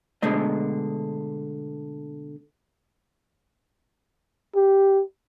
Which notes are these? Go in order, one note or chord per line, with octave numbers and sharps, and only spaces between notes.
B2 D3 G#3 A3 D#5
G4